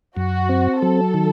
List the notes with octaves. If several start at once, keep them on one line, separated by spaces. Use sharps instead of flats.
F#2 F#4
C4
F#3 A4
D#3